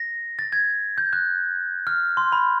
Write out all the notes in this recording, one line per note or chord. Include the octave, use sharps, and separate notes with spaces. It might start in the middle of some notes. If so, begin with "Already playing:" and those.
Already playing: A#6
A6
G#6
G6
F#6
F6
C6
B5